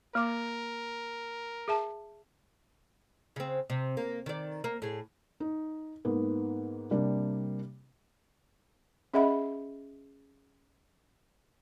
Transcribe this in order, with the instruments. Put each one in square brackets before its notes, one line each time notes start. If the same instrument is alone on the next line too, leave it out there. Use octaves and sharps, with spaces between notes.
[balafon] A#3 D6 [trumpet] A#4
[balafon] G#4 E5 A5
[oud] C#3 C4
C3
A#3
D#3 D5
A#3
A2 G#4
[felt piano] D#4
G#2 A#3 B3
C3 G3 A#3 D4
[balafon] C#4 G#4 D#5 E5 F#5 B5